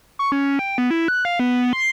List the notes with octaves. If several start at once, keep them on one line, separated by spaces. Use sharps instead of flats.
C#6
C#4
G5
B3
E4
F#6
F5
B3
C6